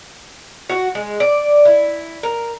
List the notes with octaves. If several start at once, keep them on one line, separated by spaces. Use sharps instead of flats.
F#4
G#3
D5
E4
A#4